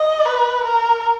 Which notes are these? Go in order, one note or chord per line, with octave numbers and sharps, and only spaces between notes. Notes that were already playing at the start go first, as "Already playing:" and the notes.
Already playing: D#5
B4
A#4